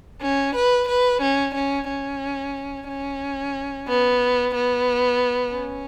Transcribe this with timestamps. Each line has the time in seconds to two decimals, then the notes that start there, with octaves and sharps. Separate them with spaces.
0.21 C#4
0.55 B4
0.89 B4
1.21 C#4
1.55 C#4
1.88 C#4
2.88 C#4
3.88 B3
4.54 B3
5.54 C#4